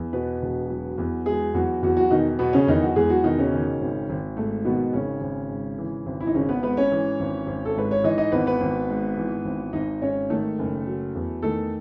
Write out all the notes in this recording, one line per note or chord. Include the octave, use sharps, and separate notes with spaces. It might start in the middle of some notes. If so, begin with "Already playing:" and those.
Already playing: E2
B2 B3 B4
E1
F#3
E2
F#3 G#3 G#4
E2 F#3 F#4
E2 F#3 F#4
F#3 F#4
B2 D#3 D#4
B2 F#3 B3
C#3 C#4
E2 D#3 D#4
F#3 F#4
E2 G#3 G#4
F#3 F#4
B2 D#3 D#4
C#3 C#4
D#3
G#1
G#1
G#2 A3
B2 D#3 B3
G#1 C#3 C#4
G#1
G#2
E3
G#1
E4
D#4
G#1 C#3 C#4
B3 B4
G#2 B3 B4
C#4 C#5
E3
G#1
G#1
A4
G#2 B4
C#5
E3 D#4 D#5
D#4 D#5
G#1 B3 B4
B3 B4
G#1
G#2
E3
G#1
G#1 D#4 D#5
G#2 C#4 C#5
D#3 A3 A4
F#1
F#3
E2
D#3 A3 A4